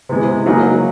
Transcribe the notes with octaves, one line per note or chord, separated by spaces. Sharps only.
C3 E3 G#3 B3
C#3 F#3 A#3 D#4 G#4